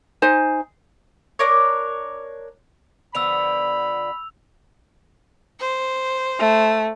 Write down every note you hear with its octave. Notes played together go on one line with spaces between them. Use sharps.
D#4 C5 G#5
D4 A#4 C#5
D3 F3 B3 B5 E6 F7
C5
A3